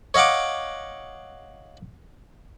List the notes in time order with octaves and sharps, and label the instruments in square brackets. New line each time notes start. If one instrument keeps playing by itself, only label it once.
[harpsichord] C#5 D#5 F5 F#5 D6